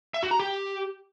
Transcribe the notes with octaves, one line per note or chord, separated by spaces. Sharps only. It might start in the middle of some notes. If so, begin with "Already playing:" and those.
E5
F#4
A#5
G4